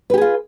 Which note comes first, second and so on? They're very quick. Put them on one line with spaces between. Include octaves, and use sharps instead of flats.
B4 G4 G#4 F4